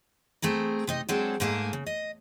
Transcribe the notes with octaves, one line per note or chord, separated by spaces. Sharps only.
A3 C4 G#4 A#4
C3 D#4 D#5
F#3 G#3 C4 D4 G#4 A4
G#2 A3 A#3 G#4 A4
C#3
D#5